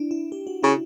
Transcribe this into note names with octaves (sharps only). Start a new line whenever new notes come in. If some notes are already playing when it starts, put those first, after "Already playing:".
Already playing: D4 E4
E4
G4
F#4
C#3 E4